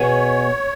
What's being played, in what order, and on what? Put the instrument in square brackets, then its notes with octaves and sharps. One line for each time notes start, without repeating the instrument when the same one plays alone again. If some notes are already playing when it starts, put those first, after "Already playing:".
Already playing: [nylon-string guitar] B2 B3 G#4 [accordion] C#5